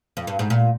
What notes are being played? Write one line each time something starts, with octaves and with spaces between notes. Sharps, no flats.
F2
G2
G#2
A#2